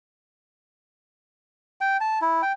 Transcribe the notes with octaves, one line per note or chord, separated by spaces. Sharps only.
G5
A5
E4
G5